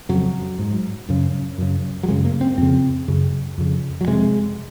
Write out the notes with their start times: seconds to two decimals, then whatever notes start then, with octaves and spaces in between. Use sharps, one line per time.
0.09 F2 C#3 F#3
0.59 G#2
1.09 F#2 C#3
1.58 F#2 C#3
2.03 F#3
2.08 F#2 C#3 G#3
2.25 A#3
2.41 C4
2.58 F2 C#3 C4
3.08 F#2 C#3
3.58 F2 C#3
4.01 F#3
4.07 F2 C3 G#3